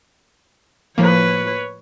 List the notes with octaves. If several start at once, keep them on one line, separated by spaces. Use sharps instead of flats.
A2 F3 A#3 B4 C#5